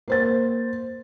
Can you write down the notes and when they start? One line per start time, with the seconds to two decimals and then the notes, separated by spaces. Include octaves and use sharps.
0.08 A#3 C5 A6